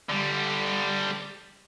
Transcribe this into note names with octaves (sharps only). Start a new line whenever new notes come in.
D3 G3